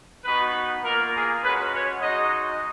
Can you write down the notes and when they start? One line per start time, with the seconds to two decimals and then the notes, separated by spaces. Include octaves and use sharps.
0.25 B3 D#4 F#4 B4
0.84 A#3 F4 A#4
1.14 G#4
1.43 G#3 C#4 F#4 B4
1.72 C#5
2.01 G#3 D#4 F#4 D#5